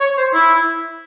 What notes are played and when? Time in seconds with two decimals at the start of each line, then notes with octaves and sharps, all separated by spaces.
0.01 C#5
0.17 C5
0.34 E4